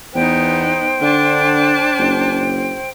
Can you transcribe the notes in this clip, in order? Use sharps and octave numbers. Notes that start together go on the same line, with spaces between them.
E2 B3 D#4 C5 G5
D3 D4 A5
F#1